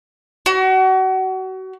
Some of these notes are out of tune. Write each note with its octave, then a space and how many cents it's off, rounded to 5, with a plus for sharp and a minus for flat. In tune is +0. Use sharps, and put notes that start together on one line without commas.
F#4 +30